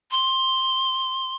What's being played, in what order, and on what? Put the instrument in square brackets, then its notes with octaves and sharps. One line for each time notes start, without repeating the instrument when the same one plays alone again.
[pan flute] C6